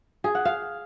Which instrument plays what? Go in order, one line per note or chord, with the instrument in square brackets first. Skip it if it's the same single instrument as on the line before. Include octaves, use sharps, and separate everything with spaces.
[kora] G#4
F#5
F5